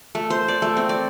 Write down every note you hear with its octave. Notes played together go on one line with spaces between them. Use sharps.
A3
C5
D5
A3
C4
D5